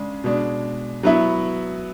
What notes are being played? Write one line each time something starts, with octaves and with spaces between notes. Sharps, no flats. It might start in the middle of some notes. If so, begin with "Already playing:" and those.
Already playing: C#3 G#3 D4
B2 G#3 D4
F#3 B3 E4